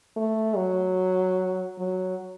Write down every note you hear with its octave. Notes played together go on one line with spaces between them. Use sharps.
A3
F#3
F#3